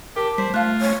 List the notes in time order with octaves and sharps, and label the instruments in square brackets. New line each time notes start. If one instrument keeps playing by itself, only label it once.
[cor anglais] G4 [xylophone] A#4 [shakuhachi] A5
[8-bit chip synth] G3 [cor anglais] C5 [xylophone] B6
[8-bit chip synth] A3 [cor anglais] F4 [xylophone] F5 F#6
[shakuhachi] C#5